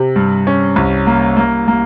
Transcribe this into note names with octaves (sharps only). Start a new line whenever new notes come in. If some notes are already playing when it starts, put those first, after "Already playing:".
Already playing: C3
G2
C#4
C2
A#3
A#3
A#3